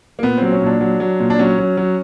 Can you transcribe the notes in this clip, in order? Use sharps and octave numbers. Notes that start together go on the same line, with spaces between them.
A#3
A#2 B3
F#3 C4
C#4
A#2 D4
F#3
F#3
A#2
D4
F#3 C#4
F#3
F#3